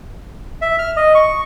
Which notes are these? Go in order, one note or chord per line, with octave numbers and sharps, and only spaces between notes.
E5
F6
D#5
C#6